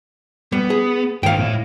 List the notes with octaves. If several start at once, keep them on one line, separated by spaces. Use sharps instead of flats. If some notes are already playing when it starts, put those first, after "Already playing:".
G3 B3
G#4
G#2 D#3 F5 G5
A2 E4